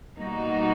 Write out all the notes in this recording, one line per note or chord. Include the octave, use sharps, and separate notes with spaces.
B2 G3 A#3 D#4 F#4